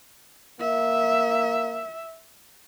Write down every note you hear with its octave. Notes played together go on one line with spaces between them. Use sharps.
A#3 E5